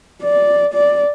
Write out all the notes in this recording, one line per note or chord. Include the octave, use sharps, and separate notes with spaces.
D5
D5